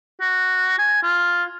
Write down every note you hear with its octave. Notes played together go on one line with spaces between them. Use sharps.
F#4
G#5
F4